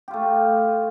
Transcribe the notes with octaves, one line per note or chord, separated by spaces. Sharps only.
A3 F4 G4